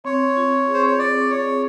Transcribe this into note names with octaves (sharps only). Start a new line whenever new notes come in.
C4 C#5
F4
G#4
C5
C#5
C4 D5
G#4 C#5